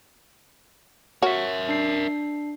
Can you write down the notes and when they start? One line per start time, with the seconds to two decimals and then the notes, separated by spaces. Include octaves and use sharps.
1.22 F#4 A#4 C#5 E5
1.69 D4 C7